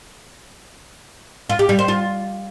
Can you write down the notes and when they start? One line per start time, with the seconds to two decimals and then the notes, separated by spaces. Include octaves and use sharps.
1.49 F4
1.59 G4
1.69 G3
1.79 C5
1.88 F4